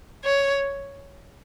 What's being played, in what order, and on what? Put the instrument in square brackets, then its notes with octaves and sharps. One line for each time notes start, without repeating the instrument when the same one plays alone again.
[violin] C#5